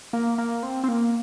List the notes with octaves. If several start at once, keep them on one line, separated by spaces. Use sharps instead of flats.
A#3
A#3
C4
C4
A#3